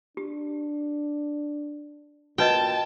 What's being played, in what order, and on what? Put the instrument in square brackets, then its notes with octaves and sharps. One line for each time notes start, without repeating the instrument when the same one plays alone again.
[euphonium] D4 [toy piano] G4
[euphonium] A#2 [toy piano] F#4 B4 D#5 [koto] G5 [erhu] A5